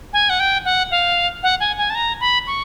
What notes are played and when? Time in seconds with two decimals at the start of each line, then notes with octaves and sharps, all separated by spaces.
0.13 G#5
0.30 F#5
0.40 G5
0.65 F#5
0.91 F5
1.43 F#5
1.60 G#5
1.78 G#5
1.90 A5
1.95 A#5
2.20 B5
2.47 C#6